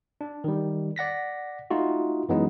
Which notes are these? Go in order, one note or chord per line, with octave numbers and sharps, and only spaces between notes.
D4
D#3 G3
D5 F#5 A#6 B6
A3 D#4 F4 F#4
F#2 E3 F#3 G#3 B3 D#4